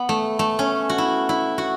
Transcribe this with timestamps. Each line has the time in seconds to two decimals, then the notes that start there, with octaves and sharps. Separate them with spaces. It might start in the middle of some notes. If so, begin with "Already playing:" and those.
Already playing: B3
0.09 A3
0.39 A3
0.59 C#4
0.89 F#4
0.98 E4
1.29 E4
1.58 F#4